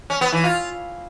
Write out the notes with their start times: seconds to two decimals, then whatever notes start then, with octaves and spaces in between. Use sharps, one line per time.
0.10 C#4
0.21 B3
0.32 E3
0.44 F4